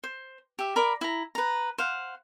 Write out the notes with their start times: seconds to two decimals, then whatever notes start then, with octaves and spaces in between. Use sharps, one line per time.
0.04 C5
0.59 G4 E5
0.76 A#4 D5 B5
1.01 E4 A#5
1.35 B4 A#5
1.78 C5 F5 F#5